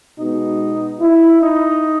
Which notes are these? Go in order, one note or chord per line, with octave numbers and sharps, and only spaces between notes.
B2 G#3 B3 D#4
E4
D#4